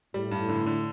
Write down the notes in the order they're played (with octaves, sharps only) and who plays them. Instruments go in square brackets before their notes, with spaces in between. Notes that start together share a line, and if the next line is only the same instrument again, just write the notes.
[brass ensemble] A2 [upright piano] G3
[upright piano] G2
D3
D3